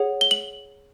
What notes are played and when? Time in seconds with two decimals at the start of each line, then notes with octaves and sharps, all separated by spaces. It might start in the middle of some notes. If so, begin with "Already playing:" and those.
Already playing: G#4 C#5 F#5
0.21 G7
0.31 F#7